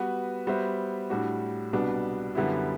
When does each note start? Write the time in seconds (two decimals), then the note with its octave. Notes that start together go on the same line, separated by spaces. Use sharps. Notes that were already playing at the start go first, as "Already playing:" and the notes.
Already playing: G3 B3 F#4 B4
0.47 G3 B3 F#4 C5 E5
1.10 A2 G3 D4 F#4
1.72 C2 B2 G3 B3 D4
2.35 F#2 D3 G3 B3 E4